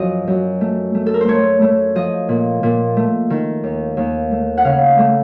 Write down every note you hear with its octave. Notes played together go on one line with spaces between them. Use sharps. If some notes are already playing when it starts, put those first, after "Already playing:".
Already playing: F#2 F3 D#5
F#2
A3
A3
A4
A#4
C5
A3 C#5
A3
F3 D#5
A#2
A#2
A3
D#3
D#2
D#2
A3
F#5
C#3 F5
A3